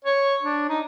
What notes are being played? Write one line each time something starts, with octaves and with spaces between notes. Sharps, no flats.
C#5
D4
D#4